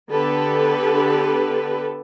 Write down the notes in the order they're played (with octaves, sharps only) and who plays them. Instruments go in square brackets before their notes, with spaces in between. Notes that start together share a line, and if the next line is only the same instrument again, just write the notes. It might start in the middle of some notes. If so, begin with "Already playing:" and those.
[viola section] D3 B3 G4 A4 B4